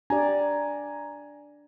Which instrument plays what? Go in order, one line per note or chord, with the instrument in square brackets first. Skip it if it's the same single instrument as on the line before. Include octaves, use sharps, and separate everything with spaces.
[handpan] D4 G4 D5 [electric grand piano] G#5 A#5